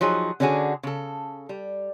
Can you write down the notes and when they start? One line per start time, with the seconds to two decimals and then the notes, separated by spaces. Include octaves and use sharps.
0.01 F3 F#3 D#4 G#4
0.40 D3 C#4 D4 F#4 G#4
0.83 C#3 A4
1.49 G3